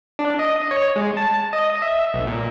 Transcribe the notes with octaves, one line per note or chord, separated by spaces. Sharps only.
D4
D#5
C#5
G#3
A5
D#5
E5
B1
A#2